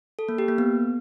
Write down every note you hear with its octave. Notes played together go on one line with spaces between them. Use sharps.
A4
A#3
G4
A#3
B3